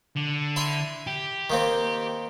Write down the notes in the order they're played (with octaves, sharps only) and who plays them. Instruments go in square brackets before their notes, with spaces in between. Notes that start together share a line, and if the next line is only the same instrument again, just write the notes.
[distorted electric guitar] D3
[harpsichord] E4 E5 C6
[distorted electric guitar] G4
[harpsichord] D#3 A#3 C4